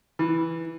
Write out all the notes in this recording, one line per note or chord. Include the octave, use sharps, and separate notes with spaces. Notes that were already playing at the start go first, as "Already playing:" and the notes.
E3